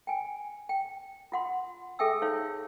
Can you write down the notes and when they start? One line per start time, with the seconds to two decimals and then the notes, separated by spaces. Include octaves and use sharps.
0.07 G5 G#5
0.69 G5
1.32 F4 F#5 C6
1.99 G#4 A4 E5 G5 G#5 E6
2.22 D#4 C#5 F5